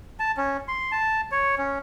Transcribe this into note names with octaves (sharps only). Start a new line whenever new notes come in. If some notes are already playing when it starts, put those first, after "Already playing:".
A5
C#4
C6
A5
C#5
C#4